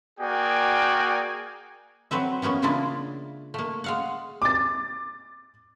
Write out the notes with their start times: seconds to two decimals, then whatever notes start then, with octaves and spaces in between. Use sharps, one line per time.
0.20 A#3 F#4 G#4 D5 G5 G#5
2.11 F#3 C4 B4 E5
2.42 E3 A#3 B3 C#4
2.62 C#3 G#3 A#3 D4 E4 F4
3.54 A3 A#3
3.84 G#3 F5 F#5
4.42 D6 A6